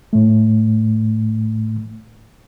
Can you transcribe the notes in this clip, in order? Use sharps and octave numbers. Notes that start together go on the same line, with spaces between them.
A2 A3